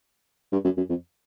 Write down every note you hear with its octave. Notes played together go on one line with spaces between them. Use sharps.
G2
F#2
F#2
F2